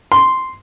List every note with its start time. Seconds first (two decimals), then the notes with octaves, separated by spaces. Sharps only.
0.12 C6